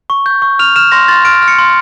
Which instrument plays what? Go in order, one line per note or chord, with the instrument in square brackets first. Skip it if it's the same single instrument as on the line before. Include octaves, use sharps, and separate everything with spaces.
[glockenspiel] C#6
G6
C#6
F6 F7
F6 E7
C6 A#6
C6 A6
F6 D7
F6
C#7
C6